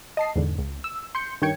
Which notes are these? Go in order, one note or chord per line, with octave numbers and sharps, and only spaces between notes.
D#5 A5 C7
E2 G#2 D3
C#2
E6
C6 G6 C#7
G2 D#3 C#5 G5 G#6 C#7